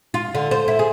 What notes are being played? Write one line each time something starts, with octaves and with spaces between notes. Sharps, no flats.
F4
D3
C5
E4
G#4